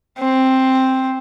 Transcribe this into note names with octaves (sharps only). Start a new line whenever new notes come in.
C4